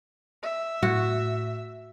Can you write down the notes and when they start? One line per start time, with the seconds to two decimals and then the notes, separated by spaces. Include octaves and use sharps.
0.43 E5
0.83 A2 F#4